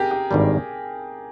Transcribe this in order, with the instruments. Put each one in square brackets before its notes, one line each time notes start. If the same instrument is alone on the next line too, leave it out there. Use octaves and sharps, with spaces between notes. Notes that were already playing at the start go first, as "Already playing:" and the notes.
Already playing: [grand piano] G4 G#4 A#4
G4
[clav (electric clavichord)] G#1 G2 D#3 G3